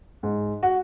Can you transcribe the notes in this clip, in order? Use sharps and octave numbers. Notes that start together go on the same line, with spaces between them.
G#2
F#4